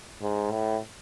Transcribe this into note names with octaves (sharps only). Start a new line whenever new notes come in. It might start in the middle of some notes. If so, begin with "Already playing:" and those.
G#2
A2